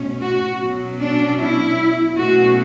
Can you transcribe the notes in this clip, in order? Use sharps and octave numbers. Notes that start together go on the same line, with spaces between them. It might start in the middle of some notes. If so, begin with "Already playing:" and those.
Already playing: B2 A3 C#4
F#4
B2 F#3 C#4
D4
E4
B2 F#3 A3 C#4 F#4